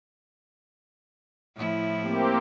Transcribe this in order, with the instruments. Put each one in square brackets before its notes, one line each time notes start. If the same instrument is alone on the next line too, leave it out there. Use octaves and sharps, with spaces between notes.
[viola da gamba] A2 F3 E4
[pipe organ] A#3 C4 G4